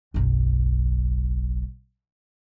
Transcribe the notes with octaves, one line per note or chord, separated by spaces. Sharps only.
F#1 B1